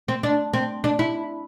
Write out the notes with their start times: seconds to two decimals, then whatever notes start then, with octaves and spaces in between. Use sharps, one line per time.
0.08 C4
0.23 D4
0.53 C4
0.84 D4
0.99 E4